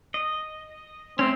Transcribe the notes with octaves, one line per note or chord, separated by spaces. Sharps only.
D#5
A3 C4 C#4